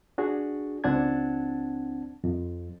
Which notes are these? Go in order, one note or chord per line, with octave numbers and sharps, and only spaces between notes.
D4 F#4 G#4
C#2 C4 D4 F#5 A5 G#6
F2